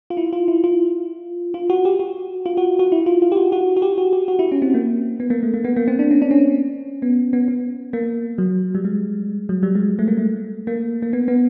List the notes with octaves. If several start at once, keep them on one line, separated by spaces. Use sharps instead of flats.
F4
E4
F4
E4
F4
F4
F#4
G4
F#4
F4
F#4
F#4
E4
F4
F4
G4
F#4
F#4
F#4
G4
F#4
G4
F#4
E4
C#4
C4
A#3
B3
A#3
A3
A#3
B3
A#3
C4
D4
C#4
D4
C#4
B3
B3
B3
A#3
F#3
G3
G#3
F#3
G3
G#3
A3
A#3
A3
A#3
A#3
B3
B3